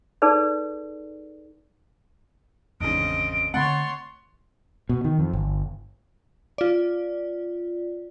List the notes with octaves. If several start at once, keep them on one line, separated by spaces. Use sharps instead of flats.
D#4 G#4 A4 B4 D5
G#1 E2 G2 C#3 C4 D#5 D7
D3 A3 C4 C#5 F#5 B5 C6 A6
B2
D#3
F2
G1
F4 D5